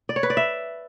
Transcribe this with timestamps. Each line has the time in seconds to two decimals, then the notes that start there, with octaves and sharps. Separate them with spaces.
0.09 D5
0.16 C#5
0.23 B4
0.30 D5
0.37 E5